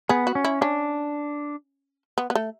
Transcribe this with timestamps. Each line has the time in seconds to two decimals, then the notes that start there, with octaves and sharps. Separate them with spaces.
0.09 B3 G#4
0.27 F#4
0.35 C#4
0.45 E4
0.61 C#4 D4
2.18 B3
2.30 B3
2.35 A3